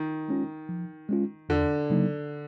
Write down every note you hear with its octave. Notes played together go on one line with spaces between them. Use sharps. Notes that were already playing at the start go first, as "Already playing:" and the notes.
Already playing: D#3
G#3 C#4 F4
F3
G#3 C#4 F4
E2 D3
C#3 F#3 A#3 D#4